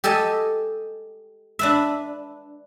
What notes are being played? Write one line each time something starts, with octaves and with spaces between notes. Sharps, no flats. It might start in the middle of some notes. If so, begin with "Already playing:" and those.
G4 A4 D#5 G#5 A5
D4 B4 E5